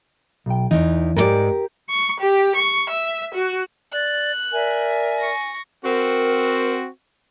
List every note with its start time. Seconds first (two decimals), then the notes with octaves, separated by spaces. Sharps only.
0.46 B1 G5
0.71 E2 E3 D#4
1.16 G#2 G4 A#4 B4 D5
1.89 C#6
2.20 G4
2.56 C#6
2.90 E5
3.35 F#4
3.93 D5 F#6
4.52 A#4 D5 E5 G#5
5.19 C#6 A#6
5.84 C4 F#4 A#4